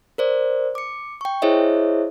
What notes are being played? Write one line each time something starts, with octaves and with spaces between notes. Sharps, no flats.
A#4 C5 D5
D6 C#7
G5 C#6
E4 G#4 C5 C#5 D#5 E5